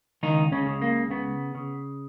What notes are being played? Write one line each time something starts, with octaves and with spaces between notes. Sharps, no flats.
C#2 D#3 D#4
C#3 C#4
C#3
A#3
C#3 B3
C#3